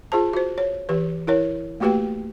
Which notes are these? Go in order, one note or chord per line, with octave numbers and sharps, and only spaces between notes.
F4 G#4 C5 A5
F#4 C5
C#5
E3 G4 B4
E4 A#4 C#5
A3 A#3 F#4 G4 B4 G5